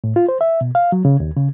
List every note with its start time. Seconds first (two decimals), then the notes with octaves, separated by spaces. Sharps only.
0.04 A2
0.16 F4
0.29 C5
0.41 E5
0.61 B2
0.75 F5
0.92 F#3
1.05 C#3
1.20 D#2
1.36 C#3